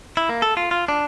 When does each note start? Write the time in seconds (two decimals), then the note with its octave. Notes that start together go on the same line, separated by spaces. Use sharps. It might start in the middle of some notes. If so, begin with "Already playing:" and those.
0.17 E4
0.29 A#3
0.42 A4
0.57 F4
0.71 F4
0.88 D4